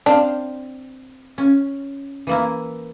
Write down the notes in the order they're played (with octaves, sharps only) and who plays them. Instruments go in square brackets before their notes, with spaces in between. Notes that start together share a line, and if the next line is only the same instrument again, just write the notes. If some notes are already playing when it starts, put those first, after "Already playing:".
[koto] C4 C5 F5 [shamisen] D4
[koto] C#4
E3 A#3 E4